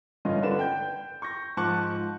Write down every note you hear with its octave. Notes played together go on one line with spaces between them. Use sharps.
G1 G2 C#4 F4 D#5
D3 D4 B4 E7
G5 G6
C#6 G6 A#6
G#2 F3 A5 C#6 D6 F#6